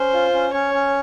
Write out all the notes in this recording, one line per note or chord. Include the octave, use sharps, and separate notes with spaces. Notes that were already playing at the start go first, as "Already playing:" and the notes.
Already playing: C#4 C5
F4
C#4
C#4 C#5
C#4